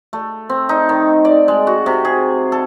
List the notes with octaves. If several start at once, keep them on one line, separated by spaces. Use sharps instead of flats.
A3
C4
D#4
D#3
D5
G#3
F#4
C3
G#4
A4